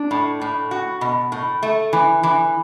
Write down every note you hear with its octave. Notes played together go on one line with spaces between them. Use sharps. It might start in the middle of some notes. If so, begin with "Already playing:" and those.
Already playing: D4
A2
A2
F#4
B2
A2
A3
E3
E3